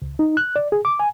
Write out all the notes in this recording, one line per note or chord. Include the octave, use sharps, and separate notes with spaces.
C#2
D#4
F#6
D5
G#4
D6
G#5